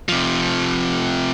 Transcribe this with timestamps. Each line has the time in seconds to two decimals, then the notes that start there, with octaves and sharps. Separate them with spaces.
0.09 C3 F3